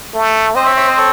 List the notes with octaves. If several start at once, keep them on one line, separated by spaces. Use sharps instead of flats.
A3
C4 C5 D#5
C#5 E5
C#5 E5
C5 D#5
A4 C#5